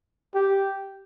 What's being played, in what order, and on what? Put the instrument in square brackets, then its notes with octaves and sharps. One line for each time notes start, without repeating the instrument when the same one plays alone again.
[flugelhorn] G4